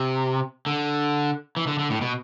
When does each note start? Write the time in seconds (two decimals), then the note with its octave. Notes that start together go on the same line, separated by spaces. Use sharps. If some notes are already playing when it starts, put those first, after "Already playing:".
Already playing: C3
0.66 D3
1.57 E3
1.67 D3
1.79 D3
1.90 A2
2.01 B2